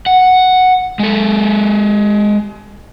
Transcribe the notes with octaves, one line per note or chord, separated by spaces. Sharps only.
F#5
G#3 A4